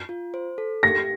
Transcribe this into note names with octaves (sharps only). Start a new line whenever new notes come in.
F4
C5
A4
G4 A#6